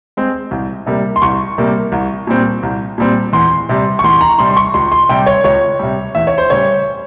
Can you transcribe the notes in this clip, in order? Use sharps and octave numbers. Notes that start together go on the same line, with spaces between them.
G#3 C4
C2
C3 G3 A#3
C6
C2 C#6
C3 G3 A#3
C2
A#2 G3 C4
C2
A#2 G3 C4
E2 C6
C3 G3
C#6
E2 C6
A#5
C3 G3 C6
C6
C#6
C#2 C6
C6
C3 G3 G5
C#5
C#2 C#5
C3 G3
E2 E5
C#5
C5
C#3 G3 C#5